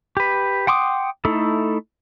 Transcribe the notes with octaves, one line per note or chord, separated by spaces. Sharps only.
G4 B4
F#5 G5 C6 D6 D#6
A3 D#4 E4 A4